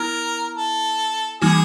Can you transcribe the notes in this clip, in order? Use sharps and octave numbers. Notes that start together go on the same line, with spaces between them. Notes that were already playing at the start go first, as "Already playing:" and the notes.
Already playing: B3 E4 A#4
A4
E3 G3 A#3 D#4 F#4 G#4